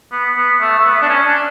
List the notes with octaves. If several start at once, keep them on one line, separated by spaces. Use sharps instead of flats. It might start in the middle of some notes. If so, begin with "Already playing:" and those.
B3
B3
A3
A3
B3
D4
C#4
D4